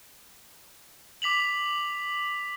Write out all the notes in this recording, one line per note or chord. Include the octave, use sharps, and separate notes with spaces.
D6 B6 F7 F#7